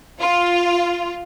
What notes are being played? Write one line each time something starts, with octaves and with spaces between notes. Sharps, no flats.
F4